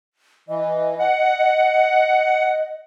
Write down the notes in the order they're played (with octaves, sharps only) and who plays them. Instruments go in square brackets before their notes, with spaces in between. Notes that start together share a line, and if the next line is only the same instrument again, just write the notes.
[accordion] E3 [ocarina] D#5
[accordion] F#5